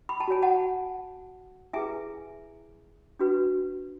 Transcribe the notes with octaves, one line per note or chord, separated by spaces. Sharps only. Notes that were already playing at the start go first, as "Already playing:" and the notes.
B5
A5
F#4 C#5 G#5
F#5 A5
E4 G#4 B4 E5 G#5
D4 F#4 B4